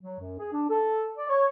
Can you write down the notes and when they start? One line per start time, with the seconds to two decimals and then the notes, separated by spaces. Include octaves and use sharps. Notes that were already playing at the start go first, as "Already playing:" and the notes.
0.03 F#3
0.20 F#2
0.39 G#4
0.53 D4
0.70 A4
1.17 D5
1.29 C#5